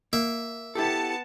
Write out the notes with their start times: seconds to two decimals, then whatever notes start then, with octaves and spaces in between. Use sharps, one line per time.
0.13 A#3 E5
0.75 B3 E4 G4 A4 A5 C#7